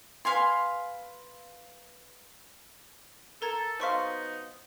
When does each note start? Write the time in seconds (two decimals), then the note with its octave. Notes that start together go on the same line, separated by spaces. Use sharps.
0.25 B4 F5 G#5 C6
3.42 A4 A#4 A#5 G#6
3.80 F#3 B3 C4 D#4 C5 F5 C#6 B6